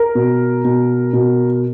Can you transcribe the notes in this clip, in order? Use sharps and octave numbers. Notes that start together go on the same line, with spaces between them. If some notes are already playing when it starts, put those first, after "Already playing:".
Already playing: A#4
B2
B2
B2